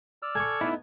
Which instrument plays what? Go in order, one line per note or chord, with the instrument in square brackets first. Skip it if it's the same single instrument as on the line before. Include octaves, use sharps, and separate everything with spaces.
[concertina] D5 E6 F6
[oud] A4 [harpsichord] G#5 C#6
[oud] B3 D#4 [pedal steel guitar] E4